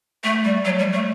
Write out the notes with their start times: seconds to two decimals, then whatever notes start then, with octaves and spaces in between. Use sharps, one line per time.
0.24 A3
0.44 G3
0.65 F#3
0.79 G3
0.93 A3